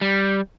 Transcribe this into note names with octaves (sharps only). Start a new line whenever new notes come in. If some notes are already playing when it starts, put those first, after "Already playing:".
G3